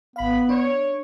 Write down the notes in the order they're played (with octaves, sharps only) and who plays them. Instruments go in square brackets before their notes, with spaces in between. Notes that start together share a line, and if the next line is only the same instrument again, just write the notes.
[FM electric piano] G#1 F5 [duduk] B3 [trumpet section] B5
[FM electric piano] D4 [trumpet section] C#5